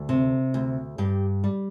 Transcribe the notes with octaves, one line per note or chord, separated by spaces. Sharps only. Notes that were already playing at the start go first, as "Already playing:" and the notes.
Already playing: D2
C3
D2
G2 G4
G3